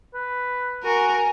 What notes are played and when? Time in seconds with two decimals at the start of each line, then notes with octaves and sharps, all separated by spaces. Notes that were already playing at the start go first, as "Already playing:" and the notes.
0.14 B4
0.84 F#4 A#4 G#5